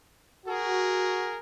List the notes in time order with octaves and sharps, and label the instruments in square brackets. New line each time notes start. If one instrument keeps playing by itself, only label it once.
[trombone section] F#4 [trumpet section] G#4 A#4